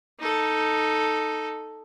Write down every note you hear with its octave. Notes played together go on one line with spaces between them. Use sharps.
D#4 A4